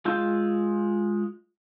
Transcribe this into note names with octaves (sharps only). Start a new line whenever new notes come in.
G#3 F4 F5 E6 G6